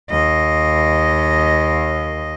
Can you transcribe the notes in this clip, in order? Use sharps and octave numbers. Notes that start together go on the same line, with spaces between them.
D#2 D#5